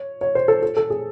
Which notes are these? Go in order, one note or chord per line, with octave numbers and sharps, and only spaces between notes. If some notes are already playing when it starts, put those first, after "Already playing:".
Already playing: C#5
C#5
C5
A4
A4
A4
G#4